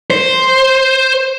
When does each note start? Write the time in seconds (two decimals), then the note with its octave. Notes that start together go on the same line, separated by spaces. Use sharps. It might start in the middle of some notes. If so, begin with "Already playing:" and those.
0.10 C5